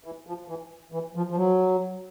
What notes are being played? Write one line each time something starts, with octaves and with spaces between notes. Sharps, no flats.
E3
F3
E3
E3
F3
F3
F#3